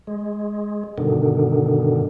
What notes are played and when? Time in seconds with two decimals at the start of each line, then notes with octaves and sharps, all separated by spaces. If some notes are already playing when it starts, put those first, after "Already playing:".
0.07 G#3
0.98 G2 B2 D3 D#3